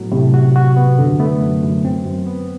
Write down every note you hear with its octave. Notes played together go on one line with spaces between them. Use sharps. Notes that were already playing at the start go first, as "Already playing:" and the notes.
Already playing: A2 F#3 B3 F#4
A2 C3
F#4
F#4
B3
F#2 D3
A3 B3
F#2
F#2
F#2 C4
F#2
B3